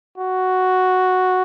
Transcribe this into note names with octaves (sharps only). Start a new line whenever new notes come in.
F#4